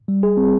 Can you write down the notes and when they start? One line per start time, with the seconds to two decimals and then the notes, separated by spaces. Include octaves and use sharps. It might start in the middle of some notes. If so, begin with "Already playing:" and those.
0.08 G3
0.23 G#4
0.37 C4